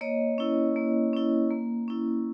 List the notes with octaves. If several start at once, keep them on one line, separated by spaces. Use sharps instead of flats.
A#3 C#5 D#5
C#4 E4
A#3
C#4 E4
A#3
C#4 E4